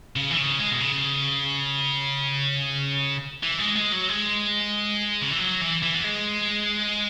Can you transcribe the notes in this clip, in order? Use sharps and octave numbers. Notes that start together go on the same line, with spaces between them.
C#3
E3
C#3
G#3
B2
C#3
E3
G#3
G#3
F#3
G#3
C#3
E3
F#3
E3
E3
B3
G#3